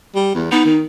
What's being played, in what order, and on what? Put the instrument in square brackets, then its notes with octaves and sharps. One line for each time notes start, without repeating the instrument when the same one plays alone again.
[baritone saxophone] G3
E2
[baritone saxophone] B3 [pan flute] D#4
[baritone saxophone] D#3